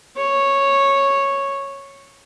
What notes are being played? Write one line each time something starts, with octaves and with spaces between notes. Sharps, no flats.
C#5